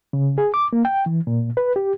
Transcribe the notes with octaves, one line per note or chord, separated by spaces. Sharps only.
C#3
G#4
D6
A#3
G5
E3
A#2
B4
G4